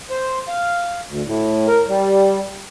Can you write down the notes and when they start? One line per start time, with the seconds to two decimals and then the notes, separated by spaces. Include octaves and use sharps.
0.10 C5
0.48 F5
1.09 D2
1.26 A2
1.68 A#4
1.88 G3